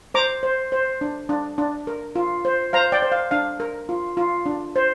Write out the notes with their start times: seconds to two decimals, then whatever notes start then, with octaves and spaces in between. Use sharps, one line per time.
0.14 C5 A#5 D6
0.43 C5
0.72 C5
1.01 D4
1.29 D4
1.58 D4
1.87 A#4
2.16 F4
2.45 C5
2.73 C5 F5 A#5
2.92 D5 G5
3.02 C5
3.12 F5
3.31 D4 F5
3.60 A#4
3.89 F4
4.17 F4
4.46 D4
4.76 C5